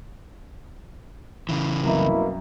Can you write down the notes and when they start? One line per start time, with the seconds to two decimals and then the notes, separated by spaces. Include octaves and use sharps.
1.49 C#3 E3
1.84 C2 F#2 B2 A#3 E4